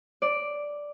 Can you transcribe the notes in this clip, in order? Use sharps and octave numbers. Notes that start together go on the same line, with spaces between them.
D5